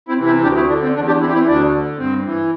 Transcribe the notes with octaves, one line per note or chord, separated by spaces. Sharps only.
C4 E4
C3 E3
C4 E4
D2 D4 G4
C4 E4
D3 D4
C4
E2 D4
D4 G4
E3 C4 E4
G4
C4 E4
D2 D4
D3
G2 C4
E3